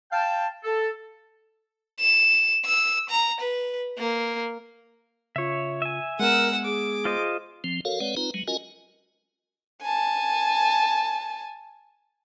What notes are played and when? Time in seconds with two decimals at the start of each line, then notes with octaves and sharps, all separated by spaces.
0.12 F5 G5 A5
0.64 A4
2.00 E7
2.65 E6
3.10 A#5
3.41 B4
3.98 A#3
5.36 C#3 F4 C#5 E5
5.82 E5 G#5
6.20 G#3 B3 A#4 F#5 E6
6.65 G#4 D6
7.05 F4 C5 D#5
7.64 F3 C4
7.85 F#4 A4 A#4 C#5 F5
8.00 G#3 C4 B4 C#5 D5 F#5
8.17 C4 D#4 F4 B4 A#5
8.34 F#3 G#3
8.48 C#4 F4 F#4 A#4 D#5 G#5
9.82 G#5 A5